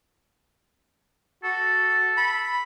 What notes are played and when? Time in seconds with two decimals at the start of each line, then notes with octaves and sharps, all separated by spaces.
1.44 F#4 A4
2.18 B5